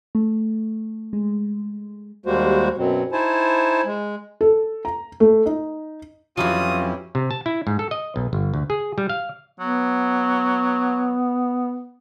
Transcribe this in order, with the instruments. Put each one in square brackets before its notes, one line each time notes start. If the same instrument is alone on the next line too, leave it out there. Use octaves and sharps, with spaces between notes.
[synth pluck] A3
G#3
[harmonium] D#2 G3 G#3 A#3 F#4 C5
F#2 B2 F#3 C4
D#4 E4 C5 G#5 A5
G#3
[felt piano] A4
A#5
A3
D#4
[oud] F2 E3 F#3 [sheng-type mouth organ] C#4 E4 G4 [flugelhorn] F4 [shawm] D#6
[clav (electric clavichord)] C3
A5
E4
G#2
A4
D#5
B1
G1
D2
G#4
G3
F5
[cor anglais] F#3 [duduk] B3